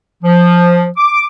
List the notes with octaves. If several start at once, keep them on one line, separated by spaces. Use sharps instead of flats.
F3
D6